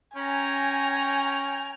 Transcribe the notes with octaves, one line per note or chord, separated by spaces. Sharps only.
C#4 G5 G#5 A#5